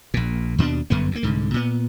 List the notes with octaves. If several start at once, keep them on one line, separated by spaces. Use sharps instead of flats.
A#1 A#2
D#2 B2 A3 D4
G1 F#2 D3 B3
D2 A#3
C2 G#2 D3
A#2 B3